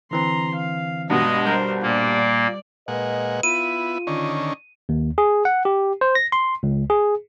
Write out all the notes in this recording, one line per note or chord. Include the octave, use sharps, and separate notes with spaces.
D3 E3 C4 A#5 C6
F5
G2 B2 G#3 D#5
G3 A#4 C5 G6
A#2 A#3 D5
A#2 G#3 B4 D#5 F#5
B3 E4 F4 D#7
D3 D#3 C#4
D#2
G#4
F#5
G4
C5
A#6
C6
C#2
G#4